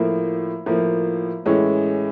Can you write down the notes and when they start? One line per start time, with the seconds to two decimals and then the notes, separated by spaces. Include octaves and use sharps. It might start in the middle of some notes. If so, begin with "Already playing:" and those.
Already playing: A2 F3 A#3
0.66 A2 F3 A#3
1.45 A2 E3 G#3 C#4